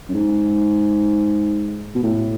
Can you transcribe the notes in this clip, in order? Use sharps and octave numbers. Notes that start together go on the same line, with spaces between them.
F#2
G#2
B2
A2